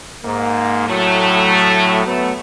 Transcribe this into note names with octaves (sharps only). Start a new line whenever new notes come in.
G#2 A#3
A2 F#3 A3
F#3 A3 B3